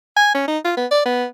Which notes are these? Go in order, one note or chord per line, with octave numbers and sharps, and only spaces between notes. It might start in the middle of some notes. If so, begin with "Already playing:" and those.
G#5
C#4
D#4
F4
B3
D5
B3